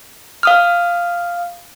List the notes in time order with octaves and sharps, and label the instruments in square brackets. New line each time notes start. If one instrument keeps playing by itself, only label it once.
[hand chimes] F5 D#6 F6